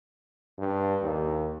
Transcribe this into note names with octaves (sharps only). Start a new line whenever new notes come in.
G2
D#2